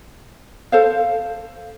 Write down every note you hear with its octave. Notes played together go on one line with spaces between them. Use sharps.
A4 C5 F5